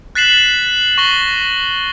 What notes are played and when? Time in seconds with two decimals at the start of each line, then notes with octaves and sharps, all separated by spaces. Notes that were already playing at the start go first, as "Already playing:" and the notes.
0.15 F#6 A6 B6 C7 E7 F#7
0.98 C#6 A#6 G7